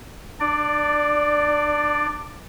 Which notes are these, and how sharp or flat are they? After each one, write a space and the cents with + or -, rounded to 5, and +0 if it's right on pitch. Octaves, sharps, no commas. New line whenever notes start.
D4 +30 D5 +0